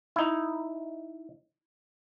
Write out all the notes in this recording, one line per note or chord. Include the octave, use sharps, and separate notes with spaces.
D#4 E4